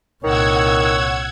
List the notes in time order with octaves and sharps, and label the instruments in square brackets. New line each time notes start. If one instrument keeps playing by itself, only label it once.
[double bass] C2 A#2 [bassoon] D#3 [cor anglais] C#5 [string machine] F#5 E6 G#6